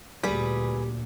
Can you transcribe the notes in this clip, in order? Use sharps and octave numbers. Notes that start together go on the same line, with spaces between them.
D2 A#2 G3 G#4 B4